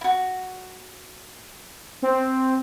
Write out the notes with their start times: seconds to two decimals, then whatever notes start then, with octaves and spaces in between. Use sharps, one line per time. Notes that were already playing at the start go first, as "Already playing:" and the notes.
0.01 E4 F#4
2.02 C4